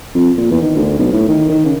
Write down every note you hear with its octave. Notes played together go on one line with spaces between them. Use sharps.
F2
A#2
E2
D#3
D2
B1
A2
D#3
D#3
C#3